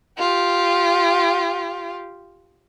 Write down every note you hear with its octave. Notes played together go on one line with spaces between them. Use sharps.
F4 G4